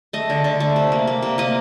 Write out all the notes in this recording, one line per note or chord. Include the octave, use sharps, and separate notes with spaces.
A3 D#5
D3
D3
A3
C3
A#3
A#3
C3
A#3 D#5